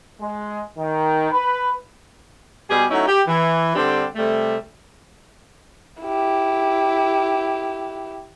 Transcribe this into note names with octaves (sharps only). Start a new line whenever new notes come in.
G#3
D#3
B4
B2 G3 G4 G#4
F#3 A3 C#4 D#4 E4
G4
E3
D3 G3 C4 D4 G4
C3 G3 A3
E4 G4